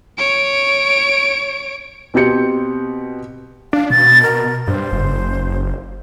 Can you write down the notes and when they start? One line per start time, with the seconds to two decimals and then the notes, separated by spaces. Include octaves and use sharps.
0.18 C#5 D7
2.14 B2 C4 G4 G6 C#7
3.73 D4 F5
3.90 B2 A6
4.23 A#4
4.68 G2 C5
4.92 F#1